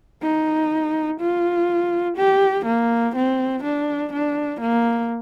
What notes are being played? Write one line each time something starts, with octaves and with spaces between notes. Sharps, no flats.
D#4
F4
G4
A#3
C4
D4
D4
A#3